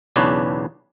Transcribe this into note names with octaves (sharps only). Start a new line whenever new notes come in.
B1 E2 C#3 D4 B4 C#5